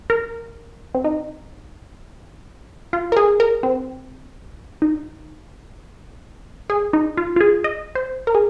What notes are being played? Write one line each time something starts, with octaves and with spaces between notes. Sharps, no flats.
A#4
C4
D#4
F4
A#4
G#4
A#4
C4
D#4
G#4
D#4
F4
F4
G#4
D#5
C5
A#4
G#4